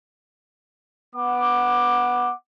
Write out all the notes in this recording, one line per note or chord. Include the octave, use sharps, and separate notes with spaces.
B3 F#5 D6